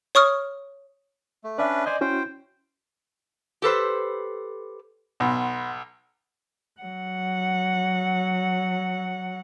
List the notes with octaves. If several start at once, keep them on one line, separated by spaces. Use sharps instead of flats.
C#5 C#6 D#6 F6
A3
C#4 D4 B4 D5 E5
C5 D5 D#5 G#5
C#4 E4 F#4 C5 G5
G4 A4 B4 C5
B1 F#5 B5 C6
F#3 F#5